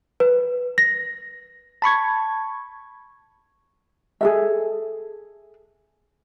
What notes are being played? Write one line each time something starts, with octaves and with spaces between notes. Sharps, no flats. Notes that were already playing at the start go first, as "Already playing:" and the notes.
B4
A#6
A5 B5 C#6 G#6
G#4 A4 E5